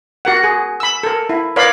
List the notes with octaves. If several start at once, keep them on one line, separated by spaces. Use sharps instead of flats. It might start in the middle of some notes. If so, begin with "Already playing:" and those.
F#4 A#4 F#5
G#4
B5 E6
A4 A#4
E4
A#4 B4 C#5 D5 F5 B5